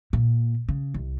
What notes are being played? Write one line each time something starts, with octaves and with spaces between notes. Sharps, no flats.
A#2
C#3
C2